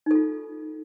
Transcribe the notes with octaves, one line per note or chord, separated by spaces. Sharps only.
D#4 F4 A4